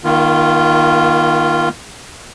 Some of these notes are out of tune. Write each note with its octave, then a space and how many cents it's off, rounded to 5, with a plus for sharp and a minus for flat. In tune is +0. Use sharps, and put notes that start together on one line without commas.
D#3 +0 A#3 +40 F4 -15